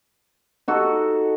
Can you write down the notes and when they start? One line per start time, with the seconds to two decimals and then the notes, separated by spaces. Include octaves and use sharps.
0.68 D#4 F#4 A4